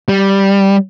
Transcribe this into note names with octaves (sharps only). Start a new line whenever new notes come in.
G3